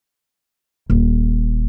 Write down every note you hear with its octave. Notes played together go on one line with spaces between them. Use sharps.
D#1